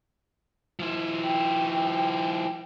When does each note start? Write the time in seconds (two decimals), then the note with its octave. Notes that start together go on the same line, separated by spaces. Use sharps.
0.80 F3 E4
1.24 G5